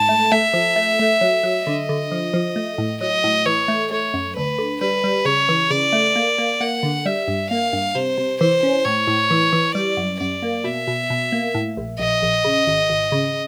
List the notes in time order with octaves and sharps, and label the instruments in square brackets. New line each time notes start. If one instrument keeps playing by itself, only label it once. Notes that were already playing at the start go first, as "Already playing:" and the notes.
Already playing: [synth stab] G#2 [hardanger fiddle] A5
[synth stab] A3
[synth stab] A3 [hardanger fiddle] E5
[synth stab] F3
A3
A3
F#3
F#3
[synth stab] D3 [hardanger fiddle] D#5
[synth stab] D3
F3
F3
A3
A2
[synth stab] F#3 [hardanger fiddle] D#5
[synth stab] A2
[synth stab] E3 [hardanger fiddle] C#5
[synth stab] A3
[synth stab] A3 [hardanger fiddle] C#5
[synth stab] F#2
[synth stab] D2 [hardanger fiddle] B4
[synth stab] D3
[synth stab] G3 [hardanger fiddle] B4
[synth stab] G3
[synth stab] C#3 [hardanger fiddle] C#5
[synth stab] E3
[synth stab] C#3 [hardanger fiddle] D5
[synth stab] A3
A#3
A#3
[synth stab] A#3 [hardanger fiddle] F#5
[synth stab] D3
[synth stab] G3 [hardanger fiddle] E5
[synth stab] G2
[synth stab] A#3 [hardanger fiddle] F5
[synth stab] G2
[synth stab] C3 [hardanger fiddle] C5
[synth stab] C3
[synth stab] E3 [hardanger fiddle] C5
[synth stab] C#4
[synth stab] A2 [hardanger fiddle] C#5
[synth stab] A2
E3
E3
[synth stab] G3 [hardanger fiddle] D5
[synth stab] F#2
[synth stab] F#2 [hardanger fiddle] D5
[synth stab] A#3
[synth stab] B2 [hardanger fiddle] E5
[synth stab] B2
B2
A#3
A2
A#1
[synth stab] A#1 [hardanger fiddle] D#5
[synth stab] A#1
C#3
G#1
G#1
C#3